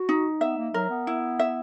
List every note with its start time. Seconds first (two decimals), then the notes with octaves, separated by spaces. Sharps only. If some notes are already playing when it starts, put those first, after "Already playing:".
Already playing: F#4
0.09 D#4
0.41 B3 E5
0.57 A#3
0.74 F#3 A#4
0.90 B3
1.07 E4
1.39 E5